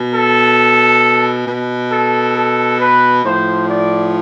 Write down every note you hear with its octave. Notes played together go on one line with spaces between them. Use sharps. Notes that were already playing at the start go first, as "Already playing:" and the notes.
Already playing: B2
A4
B2
A4
A4
B4
A2 F3 C5
D5